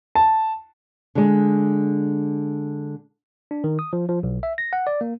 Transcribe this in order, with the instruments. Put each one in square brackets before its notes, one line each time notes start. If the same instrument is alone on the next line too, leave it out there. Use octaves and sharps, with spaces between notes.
[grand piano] A5
[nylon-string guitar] D3 G#3
[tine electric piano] D4
D#3
D#6
F3
F3
B1
E5
A#6
F#5
D5
A#3